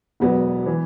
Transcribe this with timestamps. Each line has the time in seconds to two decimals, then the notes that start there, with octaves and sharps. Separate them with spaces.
0.20 E1 E2 B2 F#3 B3
0.66 E3